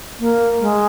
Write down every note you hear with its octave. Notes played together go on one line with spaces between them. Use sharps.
A#3
G#3